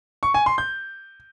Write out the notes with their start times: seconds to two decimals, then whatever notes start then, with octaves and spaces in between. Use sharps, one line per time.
0.23 C#6
0.34 G#5
0.46 C6
0.58 G6